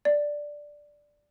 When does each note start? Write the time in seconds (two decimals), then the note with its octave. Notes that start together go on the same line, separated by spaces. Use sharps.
0.05 D5